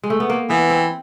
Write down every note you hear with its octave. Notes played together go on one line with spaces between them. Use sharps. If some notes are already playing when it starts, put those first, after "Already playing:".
G#3
A3
B3
A#3
E3 B3
C4